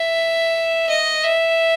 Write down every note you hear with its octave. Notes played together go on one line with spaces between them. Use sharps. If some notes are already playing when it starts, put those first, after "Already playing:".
Already playing: E5
D#5
E5